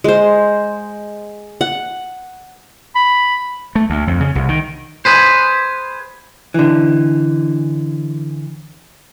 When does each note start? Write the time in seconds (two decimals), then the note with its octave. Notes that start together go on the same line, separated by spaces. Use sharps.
0.04 G#3 C5
1.61 F#5
2.96 B5
3.75 A3
3.90 D2
4.07 F2
4.20 C#3
4.35 C2
4.48 D#3
5.05 G#4 B4 C5
6.54 D3 E3